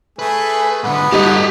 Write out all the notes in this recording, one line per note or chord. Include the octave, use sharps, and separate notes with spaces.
A3 G#4 B4
G#2 D3 B3 B4
G2 D#4 G4 G#4 A#5